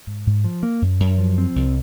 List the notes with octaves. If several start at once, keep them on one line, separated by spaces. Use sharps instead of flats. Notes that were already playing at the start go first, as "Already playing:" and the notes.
G#2
G#2
F3
A#3
F#2
F#2
F3
C4
C2